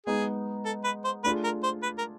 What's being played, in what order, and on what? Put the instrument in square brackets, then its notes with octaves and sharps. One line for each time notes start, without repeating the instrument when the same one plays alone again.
[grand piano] G#3 B3 D#4 [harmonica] G#4
[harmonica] A4
B4
C5
[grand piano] A3 D4 F4 G#4 [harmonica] B4
[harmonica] A#4
C5
B4
A#4